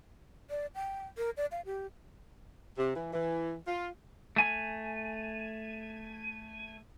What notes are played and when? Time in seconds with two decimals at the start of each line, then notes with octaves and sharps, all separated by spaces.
0.50 D5
0.75 G5
1.17 A#4
1.37 D5
1.52 F5
1.65 G4
2.77 C3
2.95 E3
3.13 E3
3.67 F4
4.36 A3 G#5